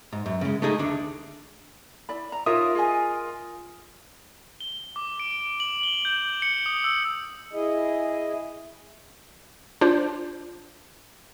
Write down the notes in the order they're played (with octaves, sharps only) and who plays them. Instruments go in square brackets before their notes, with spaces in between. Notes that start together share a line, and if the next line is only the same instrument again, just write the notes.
[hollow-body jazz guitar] G#2
F#2
C#3 G#3
A3 D#4 G#4 D#5
D2 D4
[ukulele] E4 D5 B5
A#5
[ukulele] D#4 C#5 E5 [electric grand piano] F4 A#4 D#6
[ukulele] G#4 D#5 G#5
[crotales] G7
D6
D7
F#7
G7
G6
C#7
D#6
E6
[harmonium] E4 G#4 D#5
[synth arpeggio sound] D4 F4 C5